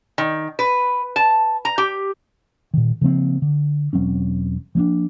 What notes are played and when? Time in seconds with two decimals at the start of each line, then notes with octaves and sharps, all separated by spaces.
0.18 D#3
0.59 B4
1.16 A5
1.65 A#5
1.78 G4
2.74 A#2 D#3
3.01 C#3 F3 A#3 C4
3.42 D3
3.93 E1 F#3 C4 C#4
4.75 F3 A#3 C4 D4